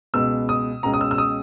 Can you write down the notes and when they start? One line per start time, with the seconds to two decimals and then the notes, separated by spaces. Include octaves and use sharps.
0.14 C#2 B2 G#3 B3 E6
0.49 D#6
0.83 C#2 B2 G#3 C#4 A#5
0.93 D#6
1.01 E6
1.11 E6
1.18 D#6